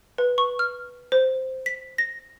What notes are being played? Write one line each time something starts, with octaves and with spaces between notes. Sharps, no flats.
B4
C#6
F6
C5
B6
A#6